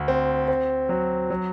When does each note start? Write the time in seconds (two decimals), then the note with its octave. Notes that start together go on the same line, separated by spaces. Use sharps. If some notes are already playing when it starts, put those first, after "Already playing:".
Already playing: D2
0.08 C4
0.48 C4
0.89 F#3
1.30 F#3